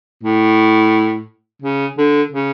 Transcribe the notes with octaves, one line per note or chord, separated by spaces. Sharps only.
A2
C#3
D3
C#3